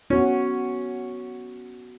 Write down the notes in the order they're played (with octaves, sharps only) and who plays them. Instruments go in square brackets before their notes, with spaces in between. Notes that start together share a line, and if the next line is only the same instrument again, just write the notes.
[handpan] B3 F#4 [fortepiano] C#4